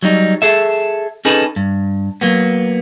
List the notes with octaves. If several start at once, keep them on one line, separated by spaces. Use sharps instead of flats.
F#3 G3 D#4
G#4 A4 E5
C#4 D#4 G#4 A4 B4
G2
F#3 A#3 B3